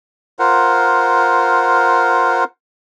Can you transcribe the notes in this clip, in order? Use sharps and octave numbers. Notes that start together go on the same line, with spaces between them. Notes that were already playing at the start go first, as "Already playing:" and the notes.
F4 A#4 C5 F#5